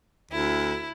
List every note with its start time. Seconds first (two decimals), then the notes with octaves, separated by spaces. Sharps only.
0.31 D2 E4